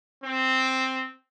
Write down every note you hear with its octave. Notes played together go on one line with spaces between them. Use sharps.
C4